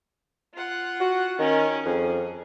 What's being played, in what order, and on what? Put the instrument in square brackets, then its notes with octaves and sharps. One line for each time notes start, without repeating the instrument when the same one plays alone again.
[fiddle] F4 F#5
[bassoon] F#4
[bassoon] D#3 [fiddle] C#4 A#4
[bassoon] F2 [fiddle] G#4